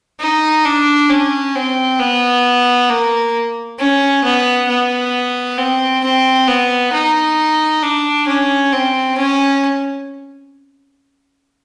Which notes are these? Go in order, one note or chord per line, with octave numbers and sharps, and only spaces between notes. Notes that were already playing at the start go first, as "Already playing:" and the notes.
D#4
D4
C#4
C4
B3
A#3
C#4
B3
B3
C4
C4
B3
D#4
D4
C#4
C4
C#4